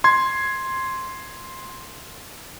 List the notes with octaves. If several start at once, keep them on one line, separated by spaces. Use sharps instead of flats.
C6 G#6